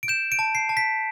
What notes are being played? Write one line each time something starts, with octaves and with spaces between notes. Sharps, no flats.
D7
G6 E7
D7
A5
C7
A5
B6